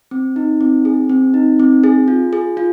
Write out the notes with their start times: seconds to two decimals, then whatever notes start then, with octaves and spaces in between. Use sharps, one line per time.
0.11 C4
0.36 D#4
0.61 C4
0.85 G#4
1.09 C4
1.34 D#4
1.60 C4
1.84 G#4
2.08 F4
2.33 G#4
2.57 F4